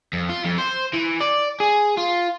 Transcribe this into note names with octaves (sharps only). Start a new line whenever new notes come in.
F2
F4
F2
C5
E3
D5
G#4
F4